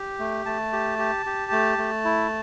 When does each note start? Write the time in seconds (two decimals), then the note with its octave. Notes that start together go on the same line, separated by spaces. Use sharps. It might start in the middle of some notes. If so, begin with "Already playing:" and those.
Already playing: G4
0.19 A3
0.46 A3 A5
0.73 G4
0.99 G4
1.26 G4
1.52 A3
1.78 A3
2.05 E4